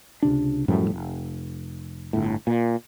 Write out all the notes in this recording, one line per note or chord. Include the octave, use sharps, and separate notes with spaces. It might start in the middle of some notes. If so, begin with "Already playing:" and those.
C#2 C3 D4
F#2 A2 F3 G3
F1
G1 A2
A#2